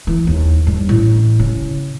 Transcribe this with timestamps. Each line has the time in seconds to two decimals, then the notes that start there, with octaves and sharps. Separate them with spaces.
0.07 E3
0.27 D#2
0.67 G2
0.89 A1
1.40 C#3